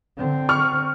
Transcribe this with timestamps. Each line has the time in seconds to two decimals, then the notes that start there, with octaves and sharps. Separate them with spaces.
0.17 D3 C4
0.49 C#6 F6